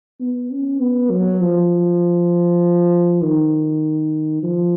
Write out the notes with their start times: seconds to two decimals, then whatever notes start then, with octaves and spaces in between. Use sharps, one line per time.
0.20 B3
0.51 C#4
0.80 B3
1.11 F#3
1.41 F3
3.22 D#3
4.43 F3